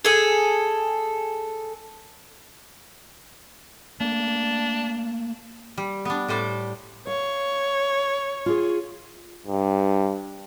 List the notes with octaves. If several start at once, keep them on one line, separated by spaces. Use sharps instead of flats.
G#4 A4
A3 A#3 D4
G3
B3 D4
A2 G3 C5 D5
C#5 F5
F4 G#4
G2